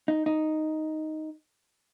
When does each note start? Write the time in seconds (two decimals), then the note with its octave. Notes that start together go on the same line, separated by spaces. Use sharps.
0.08 D#4
0.26 D#4